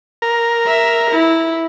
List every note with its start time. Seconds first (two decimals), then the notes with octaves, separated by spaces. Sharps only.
0.22 A#4
0.66 E5
1.11 E4